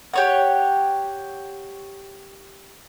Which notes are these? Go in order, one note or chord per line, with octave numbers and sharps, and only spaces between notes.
G4 C#5 F#5